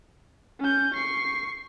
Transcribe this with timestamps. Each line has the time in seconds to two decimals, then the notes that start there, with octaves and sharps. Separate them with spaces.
0.60 C#4 G6
0.94 C#6 C7